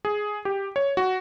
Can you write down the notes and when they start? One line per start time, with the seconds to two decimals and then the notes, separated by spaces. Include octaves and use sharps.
0.05 G#4
0.45 G4
0.76 C#5
0.97 F#4